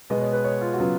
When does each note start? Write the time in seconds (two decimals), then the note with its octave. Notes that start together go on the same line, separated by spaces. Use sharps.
0.10 B2 G#3 B3 D#5
0.21 C#5
0.33 B4
0.45 C#5
0.61 F4
0.74 F#4
0.78 C#3 F#3 B3 F4